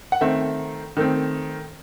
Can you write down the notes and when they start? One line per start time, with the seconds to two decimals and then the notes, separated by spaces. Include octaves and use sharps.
0.12 F#5
0.21 D#3 A3 C4 E5
0.97 D#3 A3 C4